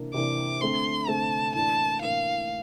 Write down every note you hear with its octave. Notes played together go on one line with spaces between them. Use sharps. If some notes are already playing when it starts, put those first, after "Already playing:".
Already playing: C3 E3 A#3 D4
C3 E3 A#3 D4 D6
D3 A3 C4 C6
D3 A3 C4 A5
A2 E3 A#3 D4 A5
A2 E3 A#3 D4 F5